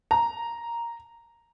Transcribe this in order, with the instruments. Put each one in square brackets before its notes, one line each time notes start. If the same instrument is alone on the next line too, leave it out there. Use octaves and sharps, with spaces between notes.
[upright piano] A#5